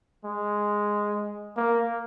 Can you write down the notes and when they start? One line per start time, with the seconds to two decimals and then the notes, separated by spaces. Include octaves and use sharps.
0.25 G#3
1.57 A#3